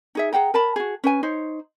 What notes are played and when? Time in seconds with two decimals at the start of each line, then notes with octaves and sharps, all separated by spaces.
0.15 D#4 G#4 E5
0.33 G#4 F#5 G5 A#5
0.54 A#4 A5 B5
0.76 F#4 G#4
1.04 C#4 B4 G#5
1.23 D#4 C5 C#5